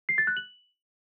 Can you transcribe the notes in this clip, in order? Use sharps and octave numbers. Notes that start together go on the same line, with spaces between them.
C7
A6
F#6
F#7